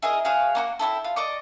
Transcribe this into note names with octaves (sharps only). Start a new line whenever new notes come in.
E4 G#4 A#4 D#5
F#4 G#4 C#5 F5
A#3 D#4 F#4
C4 C#4 E4 A4
F4
D5 D#5 C#6 D6